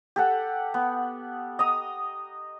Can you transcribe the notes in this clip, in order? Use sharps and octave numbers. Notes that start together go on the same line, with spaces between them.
G4 A4 F#5
B3
D#5 A#5 D#6